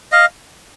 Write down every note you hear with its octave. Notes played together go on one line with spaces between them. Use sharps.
D#5 F5